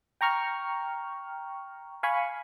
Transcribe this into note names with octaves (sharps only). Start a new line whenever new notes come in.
G5 A#5 C#6 F6
F5 G#5 B5 C#6